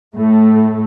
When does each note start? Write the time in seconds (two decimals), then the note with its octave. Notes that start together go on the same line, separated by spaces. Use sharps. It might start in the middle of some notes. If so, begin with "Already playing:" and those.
0.15 A2 A3